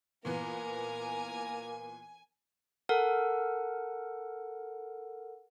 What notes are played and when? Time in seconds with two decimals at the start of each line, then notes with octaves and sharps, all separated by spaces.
0.25 A#2 E3 A#3 B3 A#4 G#5 A#5
2.89 A4 A#4 F#5